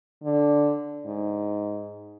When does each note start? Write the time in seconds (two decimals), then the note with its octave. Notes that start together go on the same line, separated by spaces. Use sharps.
0.24 D3
1.06 G#2